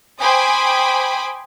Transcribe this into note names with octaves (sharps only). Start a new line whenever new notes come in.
C5 G5 G#5 B5 D6 D#6